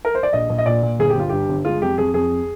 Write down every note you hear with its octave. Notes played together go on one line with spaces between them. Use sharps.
A#4
C5
D5
A#1 D#5
A#1
D#5
A#2 D5
A#2
G1 G#4
G4
G1 F4
G2 G4
G1
G#3 F4
F2 G4
F2 G#4
F2 G#4